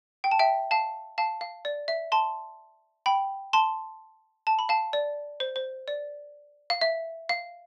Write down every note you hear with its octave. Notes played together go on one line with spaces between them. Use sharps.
G5
A5
E5 G5
F5 A5
F5 A5
F5
D5
E5
A5 C6
G5 B5
A5 C6
A5
B5
F5 A5
D5
C5
C5
D5
F5
E5
F5